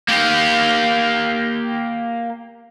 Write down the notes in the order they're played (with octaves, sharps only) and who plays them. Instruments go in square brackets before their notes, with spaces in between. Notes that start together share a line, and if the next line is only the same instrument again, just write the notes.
[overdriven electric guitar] A#3 G4